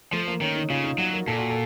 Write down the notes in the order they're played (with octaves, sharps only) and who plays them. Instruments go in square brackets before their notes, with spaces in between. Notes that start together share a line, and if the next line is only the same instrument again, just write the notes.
[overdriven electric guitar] F3 [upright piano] A3
[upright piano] A#3
[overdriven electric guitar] D#3 [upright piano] C#4
[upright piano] D#4
[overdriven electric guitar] C#3 [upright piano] F4
[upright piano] D#4
[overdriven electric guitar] F#3 [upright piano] F#4
[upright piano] A#4
[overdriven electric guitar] A#2 [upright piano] A4
[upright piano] F#4
A4